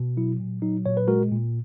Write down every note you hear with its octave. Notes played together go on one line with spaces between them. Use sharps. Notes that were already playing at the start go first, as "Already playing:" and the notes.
Already playing: B2
F#3 E4
A#2
F#3 D#4
A#2 C#5
B4
G#3 F#4 A#4
A#2